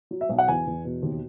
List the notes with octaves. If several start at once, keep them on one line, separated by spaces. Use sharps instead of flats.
F#3
E5
B1
F#5
E2 G#5
E2
B2
D#2